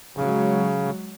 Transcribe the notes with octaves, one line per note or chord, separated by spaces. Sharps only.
C#3 F#3 G#3